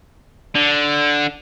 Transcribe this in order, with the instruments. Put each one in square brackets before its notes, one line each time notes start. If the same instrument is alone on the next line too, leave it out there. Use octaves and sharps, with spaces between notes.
[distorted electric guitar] D3